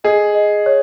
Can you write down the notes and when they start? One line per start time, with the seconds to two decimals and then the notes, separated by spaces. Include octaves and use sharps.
0.04 G#4 D#5
0.35 D#5
0.66 C#5